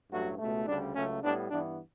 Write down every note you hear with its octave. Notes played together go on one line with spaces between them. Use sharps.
A1 G2 F#3 A3 F#4
C#2 B2 A3
D2 C#3 G3 D4
C#2 C#3 F#3 A3 C#4
A2 G3 B3 D4
G2 E3 B3 D4